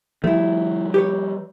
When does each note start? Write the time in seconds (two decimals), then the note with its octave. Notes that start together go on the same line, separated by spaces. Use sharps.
0.24 F3 G3 A3 E4
0.94 G4 B4 C#5